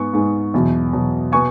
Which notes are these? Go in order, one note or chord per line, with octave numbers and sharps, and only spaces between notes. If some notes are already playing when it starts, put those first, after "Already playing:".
Already playing: G#2 G#3 B3 C#6
G#2 G#3 B3
E2 B2 F#3
E2 B2 F#3
B2 B3 G#5 C#6